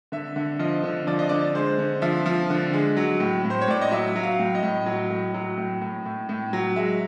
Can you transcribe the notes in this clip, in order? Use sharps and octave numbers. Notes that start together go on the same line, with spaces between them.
D3 E5
D3
F3 D#5
D3
F3 D5
D#5
D3 D5
G#3 C5
D3
F3 E5
F3
D3
G#3
F#3
A2
A2
C5
C#5
A2 D5
D#5
F#3 E5
F#3
F5
A2
D#5
A2
F#3
A2
F#3
A2
A2
A2
A2
F#3
G#3 E5